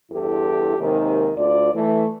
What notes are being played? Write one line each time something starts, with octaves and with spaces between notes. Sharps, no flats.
E2 G2 E4 G4 A4
D#2 G#2 C3 D#3
D2 F4 D5
E3 A3